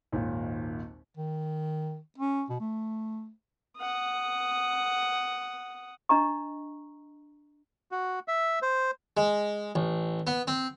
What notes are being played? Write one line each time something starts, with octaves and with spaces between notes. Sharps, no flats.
G#1 D#2 A#2
D#3
C#4
B2
A3
F#5 D#6
D4 D#5 A#5 C#6
F#4
E5
C5
G#3
A1
B3
C4